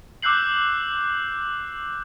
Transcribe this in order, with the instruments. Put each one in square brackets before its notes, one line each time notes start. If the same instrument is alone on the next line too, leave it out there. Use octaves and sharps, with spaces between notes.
[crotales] D6 E6 F#6 G6 C7 F#7